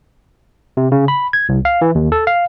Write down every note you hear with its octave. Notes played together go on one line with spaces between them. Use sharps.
C3
C#3
B5
G#6
C2
F5
E3
D#2
A4
F5